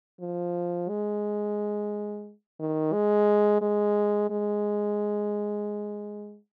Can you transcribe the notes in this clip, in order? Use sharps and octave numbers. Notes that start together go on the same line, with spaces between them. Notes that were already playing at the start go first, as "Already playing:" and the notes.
F3
G#3
D#3
G#3
G#3
G#3